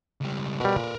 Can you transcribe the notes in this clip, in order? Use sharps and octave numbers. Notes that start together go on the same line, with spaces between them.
C#2 G3
B2 G3 A#4 B4
A#2